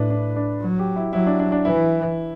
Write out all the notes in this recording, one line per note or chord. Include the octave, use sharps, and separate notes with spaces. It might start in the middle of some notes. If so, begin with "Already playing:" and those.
Already playing: A2 D4 E4 B4
D4
D4
F#3
G4
E4
F#3 E4
D4
D4
D4
E3 E4